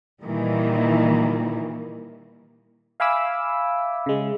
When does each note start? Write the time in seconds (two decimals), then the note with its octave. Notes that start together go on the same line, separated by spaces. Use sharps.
0.24 A#2 D#3 E3 G3 A#3
3.00 E5 F5 G#5 B5 D6 E6
4.06 C#3 G#3